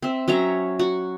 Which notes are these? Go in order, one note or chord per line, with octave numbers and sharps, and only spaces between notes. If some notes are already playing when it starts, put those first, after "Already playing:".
C4 E5
F#3 C#4 E5 A#5
F#4